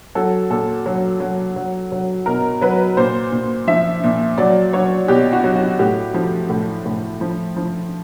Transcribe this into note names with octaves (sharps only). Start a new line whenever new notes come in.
F#3 A4
A#2 A4
F#3
F#3
F#3
F#3
B2 A#4
F#3 B4
A#2 C5
A#2
F3 E5
A#2
F#3 D5
F#3 C#5
B2 G4
F#4
F#3
F#4
A2 G4
F3
A2
A2
F3
F3